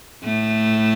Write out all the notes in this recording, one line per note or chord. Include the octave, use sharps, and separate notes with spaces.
A2 A3